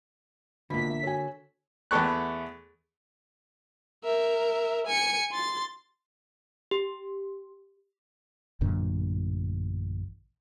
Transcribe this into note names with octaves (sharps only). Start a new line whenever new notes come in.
A#1 B2 D3 E3 A#3 F#4 B5 B6
E5
F#4 A4 C#5 G#5
E2 A3 B3 A4 C#6 F#6
A#4 E5
G#5 C#7
C6 A6
G4
A1 F#2 A#2 D3